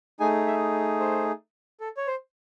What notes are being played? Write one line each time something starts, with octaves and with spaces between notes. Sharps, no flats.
A3 D#4 G#4 G#5
E5
C5
A4
C#5
C5